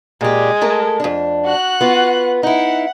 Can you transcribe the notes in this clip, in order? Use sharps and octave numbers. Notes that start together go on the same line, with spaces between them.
A#2 G#3 G4
A3 A4 A#4
F2 D4
F#4 F#6
B3 F4
D#4 E4 F#5